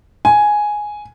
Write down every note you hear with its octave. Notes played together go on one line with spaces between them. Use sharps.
G#5